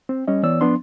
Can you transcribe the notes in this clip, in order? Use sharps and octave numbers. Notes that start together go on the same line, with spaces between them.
C4
G3 C#4 D#5
E3 B3 C#5 D5 E6
F3 B3 D4 C6